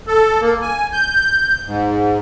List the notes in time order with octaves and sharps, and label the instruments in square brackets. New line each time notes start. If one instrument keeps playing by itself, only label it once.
[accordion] A4
A#3
G#5
G6
G#2